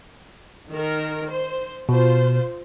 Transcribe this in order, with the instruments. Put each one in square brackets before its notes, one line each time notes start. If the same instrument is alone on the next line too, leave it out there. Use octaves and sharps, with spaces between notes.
[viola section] D#3 A#4
C5
[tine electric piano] B2 [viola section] F4 C5